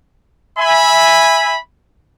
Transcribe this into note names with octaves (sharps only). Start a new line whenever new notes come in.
E5 G#5 B5